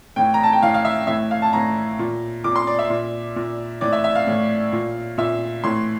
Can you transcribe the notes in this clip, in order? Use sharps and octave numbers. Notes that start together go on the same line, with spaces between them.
A2 E3 G5
A#5
A5
G5
A2 E3 F5
F5
E5
A2 E3 E5
F5
A5
A2 E3 A#5
A#2
A#2 D6
C6
D5
E5
A#2
A#2
A2 E3 D5
E5
E5
F5
A2 E3
A#2
A#2 E5
A2 E3 C6